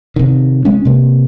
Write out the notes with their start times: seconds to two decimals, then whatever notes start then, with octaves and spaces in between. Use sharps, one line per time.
0.16 C3 D#3
0.65 G#3 C#4
0.85 C3 A#3